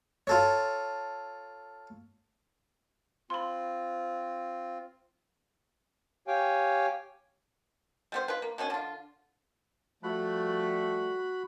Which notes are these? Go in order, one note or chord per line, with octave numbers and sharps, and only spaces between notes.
F4 A4 C#5
C4 F4 B5 C6
G4 C#5 F5 G5 G#5
G3 B3 C5
F4 B4
A#3
B2 D#3 C#4
D3 F4
F3 G3 A3 F#4 B5 F#6